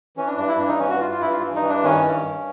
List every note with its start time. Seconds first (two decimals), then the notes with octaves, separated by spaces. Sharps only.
0.17 E3 C#4
0.27 D4
0.37 G2 D4
0.48 E4
0.58 G2 D4
0.68 D#4
0.79 E3 C#4
0.90 F#4
1.00 E3 F4
1.11 F4
1.20 G2 E4
1.32 F4
1.42 G2
1.56 D#4
1.62 E3
1.70 D4
1.83 D#3 C#4
2.04 G2
2.25 G2